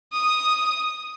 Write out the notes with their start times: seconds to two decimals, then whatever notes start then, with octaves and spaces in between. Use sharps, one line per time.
0.13 D#6